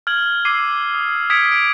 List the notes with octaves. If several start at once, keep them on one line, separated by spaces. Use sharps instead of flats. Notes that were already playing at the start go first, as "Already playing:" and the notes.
F6 G#6 F#7
D6 E6 G#6 C7 D#7
D#6
D#6 G#6 B6 C#7 D7 E7
D7